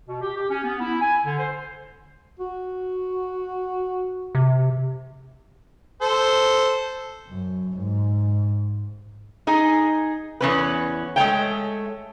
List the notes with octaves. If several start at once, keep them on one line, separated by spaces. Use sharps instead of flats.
B2
G4
G4
C#4
B3
E4
G#5
D3
C5
F#4
C3
A4 C5
F#2
G#2
D#4 G#4
E2 C#4 B4
G#3 A3 C#5 G5